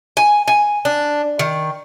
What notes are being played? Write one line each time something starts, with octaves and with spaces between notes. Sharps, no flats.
G#5
G#5
D4
D#3